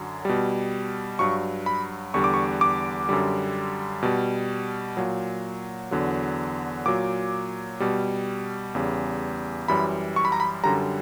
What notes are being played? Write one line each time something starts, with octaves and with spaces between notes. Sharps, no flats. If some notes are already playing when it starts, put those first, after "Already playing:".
Already playing: F#2 D3 F#3
B2 G3
G2 F#3 C#6
B5
E2 D3 G3 C#6
D6
C#6
D6
F#2 D3 G3
B2 G3
A#2 F#3
E2 D3 F#3
A#2 F#3 D6
B2 G3
E2 C#3 G3
F#2 E3 G3 B5
C#6
B5
A#5
B5
F#2 D3 G3 A#5